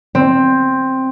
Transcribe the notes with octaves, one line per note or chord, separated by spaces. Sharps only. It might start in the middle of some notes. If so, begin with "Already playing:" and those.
C4